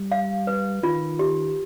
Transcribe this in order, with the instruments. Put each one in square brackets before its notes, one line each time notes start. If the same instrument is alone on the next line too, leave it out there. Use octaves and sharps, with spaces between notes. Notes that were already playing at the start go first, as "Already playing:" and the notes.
Already playing: [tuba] G3
[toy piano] F5
B4
[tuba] D#3 [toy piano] F4
[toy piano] G4